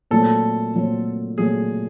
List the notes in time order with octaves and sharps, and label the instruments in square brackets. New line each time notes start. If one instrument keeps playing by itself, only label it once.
[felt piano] A#2 F#3 A3 C4 [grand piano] A4
[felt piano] A#2 F#3 A3 C4
[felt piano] A#2 F#3 A3 C4 [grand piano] G#4